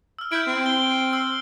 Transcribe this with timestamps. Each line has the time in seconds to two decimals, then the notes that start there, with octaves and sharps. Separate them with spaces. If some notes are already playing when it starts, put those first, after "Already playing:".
0.19 E6 F6
0.32 E4 G6 D7
0.47 C4
0.66 G7
1.13 E6